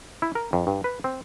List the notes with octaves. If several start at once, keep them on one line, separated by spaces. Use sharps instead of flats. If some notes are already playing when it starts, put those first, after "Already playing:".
E4
A#4
F2
G2
B4
C4